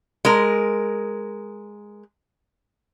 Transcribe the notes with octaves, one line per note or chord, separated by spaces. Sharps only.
G#3 A#4